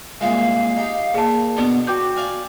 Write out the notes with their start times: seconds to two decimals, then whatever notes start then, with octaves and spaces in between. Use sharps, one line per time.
0.21 C2 A#2 G#3 F5
0.77 D#4 G4
1.14 A#2 G#4 A5
1.57 B2 B3 D4 D6
1.87 F#4 B4 G5 D6 G6
2.16 D5 F5 G#5